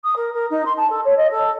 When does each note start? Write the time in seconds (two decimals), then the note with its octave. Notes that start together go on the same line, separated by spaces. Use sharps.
0.04 D#6
0.16 A#4
0.33 A#4
0.50 D#4
0.65 C6
0.77 A5
0.90 A4
1.04 C#5
1.17 D#5
1.30 A4